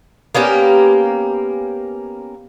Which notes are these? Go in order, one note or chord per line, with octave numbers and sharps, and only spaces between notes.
A#3 B3 C#4 G4